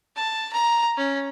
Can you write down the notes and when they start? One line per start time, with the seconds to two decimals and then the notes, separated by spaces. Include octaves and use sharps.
0.16 A5
0.53 A#5
0.97 C#4